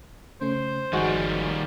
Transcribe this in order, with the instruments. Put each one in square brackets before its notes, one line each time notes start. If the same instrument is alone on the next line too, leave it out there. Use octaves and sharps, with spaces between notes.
[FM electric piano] C#3 A3 C#4 [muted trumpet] C5
[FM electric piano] G1 F3 A#5 [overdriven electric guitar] D#3 G3 [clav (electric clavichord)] G#3 F#4